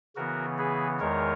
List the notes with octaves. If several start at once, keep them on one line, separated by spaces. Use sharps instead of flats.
C#3 E3 B3 F#4 A#4
G#4 B4
E2 D#3 G#3 A#4 C#5